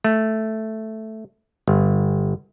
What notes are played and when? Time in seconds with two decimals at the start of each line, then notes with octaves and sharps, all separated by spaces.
0.04 A3
1.68 G1